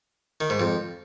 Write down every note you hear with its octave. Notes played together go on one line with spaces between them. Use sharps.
D#3
G#2
F2